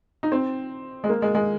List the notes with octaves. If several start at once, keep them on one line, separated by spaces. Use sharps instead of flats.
D#4
C4
G#3
A#3
G#3
G#3